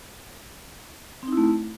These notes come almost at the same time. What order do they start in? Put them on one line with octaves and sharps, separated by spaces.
C4 D#4 E4 A3